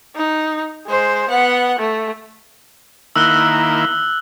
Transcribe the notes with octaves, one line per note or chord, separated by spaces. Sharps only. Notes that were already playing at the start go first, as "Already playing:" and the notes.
D#4
G#3 C5
B3 F#5
A3
D#3 A#3 E4 E6 F#6 G7